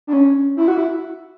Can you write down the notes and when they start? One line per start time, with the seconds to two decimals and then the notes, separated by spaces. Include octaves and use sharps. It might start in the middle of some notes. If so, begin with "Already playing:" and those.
0.07 D4
0.13 C#4
0.57 E4
0.68 F#4
0.78 E4